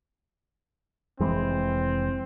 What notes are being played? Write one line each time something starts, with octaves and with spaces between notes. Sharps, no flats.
F1 E3 G#3 C4